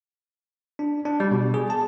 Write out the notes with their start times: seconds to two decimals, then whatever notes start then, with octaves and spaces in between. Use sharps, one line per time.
0.79 D4
1.05 D4
1.20 G3
1.31 B2
1.54 G#4
1.70 A5